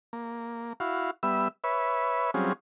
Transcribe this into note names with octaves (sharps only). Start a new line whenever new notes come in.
A#3
E4 F#4 F5
G3 B3 E5 E6
B4 C#5 E5
F#3 G3 C4 C#4 F4 G#4